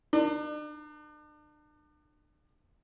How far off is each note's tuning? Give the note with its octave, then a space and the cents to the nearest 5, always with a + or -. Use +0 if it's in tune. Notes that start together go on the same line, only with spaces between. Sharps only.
D4 +40 A#4 +0